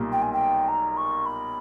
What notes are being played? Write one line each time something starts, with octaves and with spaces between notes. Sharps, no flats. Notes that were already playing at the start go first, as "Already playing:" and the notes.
Already playing: B1 A#2 G3 A#3
G5
G#5
G5
A#5
C#6
B5